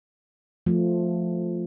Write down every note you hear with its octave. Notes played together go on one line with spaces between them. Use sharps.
F3 A3